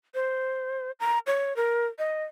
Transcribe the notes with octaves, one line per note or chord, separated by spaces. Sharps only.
C5
A#5
C#5
A#4
D#5